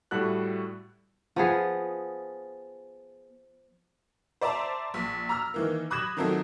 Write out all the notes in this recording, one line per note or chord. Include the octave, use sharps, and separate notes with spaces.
A2 G3 E4 F#4 A4 F#6
F3 B3 G#4
C5 D5 E5 A5 A#5
A#1
A#5 E6 F6
D#3 E3 A#3
B5 D#6 F#6 G#6 A#6 E7
D#3 F3 F#3 A3 C4